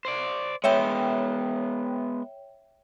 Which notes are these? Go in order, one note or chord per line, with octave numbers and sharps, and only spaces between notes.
C5 D5
G#3 B3 C#5 E5 G5